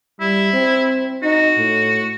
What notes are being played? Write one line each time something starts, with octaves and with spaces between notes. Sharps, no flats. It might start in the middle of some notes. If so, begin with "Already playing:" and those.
G3 E4
C4
D#4 F#4
A2